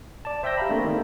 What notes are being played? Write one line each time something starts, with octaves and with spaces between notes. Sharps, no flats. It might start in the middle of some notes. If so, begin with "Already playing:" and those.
D5 A5
C5 E5 G5 E6 G6 A#6
G4 F5 A#5 B5
A3 A#3 C4 D4
D#3 A#3 D#4